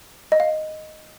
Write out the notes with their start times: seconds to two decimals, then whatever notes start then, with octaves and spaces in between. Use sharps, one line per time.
0.32 D#5
0.40 F5